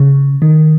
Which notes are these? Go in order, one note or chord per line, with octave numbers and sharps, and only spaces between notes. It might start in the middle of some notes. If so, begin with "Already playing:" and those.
Already playing: C#3
D#3